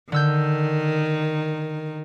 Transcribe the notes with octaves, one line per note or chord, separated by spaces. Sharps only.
D3 D#3 E6 G6